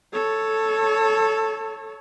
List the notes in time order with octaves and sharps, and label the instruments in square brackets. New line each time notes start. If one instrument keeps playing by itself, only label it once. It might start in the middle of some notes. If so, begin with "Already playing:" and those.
[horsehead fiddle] A4 C#5